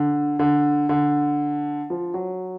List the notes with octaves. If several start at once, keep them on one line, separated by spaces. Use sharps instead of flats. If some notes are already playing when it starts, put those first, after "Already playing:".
Already playing: D3
D3
D3
F3
F#3